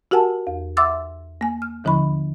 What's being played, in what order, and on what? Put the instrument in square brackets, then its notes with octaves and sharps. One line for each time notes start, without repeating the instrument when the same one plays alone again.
[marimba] F#4 G4 A#4 F#5 G#5 A5
E2
E5 F#5 C6 D6 E6 A6
A#3 G#5
F6
D#2 D3 F3 E4 B5 C#6